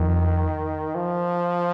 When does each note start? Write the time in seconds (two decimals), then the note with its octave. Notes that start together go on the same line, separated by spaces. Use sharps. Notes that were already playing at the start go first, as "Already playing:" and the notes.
Already playing: F2 D#3
0.95 F3